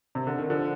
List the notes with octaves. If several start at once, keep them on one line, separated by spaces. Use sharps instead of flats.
C3
D3
D#3
D3 F3